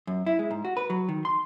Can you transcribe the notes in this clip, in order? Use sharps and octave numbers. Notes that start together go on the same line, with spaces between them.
F#2
E4
G#3
G#2
F#4
B4
F#3
D#3
C6